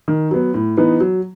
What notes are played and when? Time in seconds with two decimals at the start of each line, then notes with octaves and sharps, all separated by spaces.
0.08 D#3
0.31 F#3 B3
0.54 A2
0.77 E3 B3 D#4
1.00 F#3